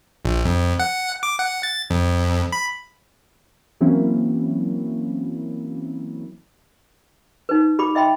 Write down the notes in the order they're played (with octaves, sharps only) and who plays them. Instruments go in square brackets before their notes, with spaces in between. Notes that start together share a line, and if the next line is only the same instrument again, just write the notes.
[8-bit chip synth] A#1
F2
F#5
D6
F#5
A6
F2
B5
[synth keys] E3 F#3 A#3 C4 C#4 E4
[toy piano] D#4 B4
G4 B5 D6
D#5 E5 G5 B5 C6